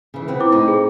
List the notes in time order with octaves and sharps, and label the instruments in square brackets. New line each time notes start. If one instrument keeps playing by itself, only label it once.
[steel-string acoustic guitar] C#3 E3
B3 C4 B4
[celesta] E4 D6
[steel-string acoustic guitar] A2 C4 D#4
[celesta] G#4